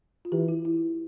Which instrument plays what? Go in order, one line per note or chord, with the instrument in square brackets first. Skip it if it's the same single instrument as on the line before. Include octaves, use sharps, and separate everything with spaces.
[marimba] F4
[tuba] E3 [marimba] G4
[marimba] E4
E4